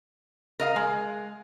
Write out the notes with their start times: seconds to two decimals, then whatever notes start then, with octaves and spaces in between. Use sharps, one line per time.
0.60 A#4 D#5 F5
0.76 G#3